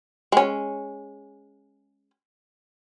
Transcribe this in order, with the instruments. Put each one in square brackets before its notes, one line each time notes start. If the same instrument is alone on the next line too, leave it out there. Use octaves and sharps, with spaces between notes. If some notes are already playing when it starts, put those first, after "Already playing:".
[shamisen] G#3 C#4